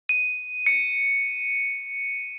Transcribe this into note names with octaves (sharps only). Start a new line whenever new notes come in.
D#7
C#7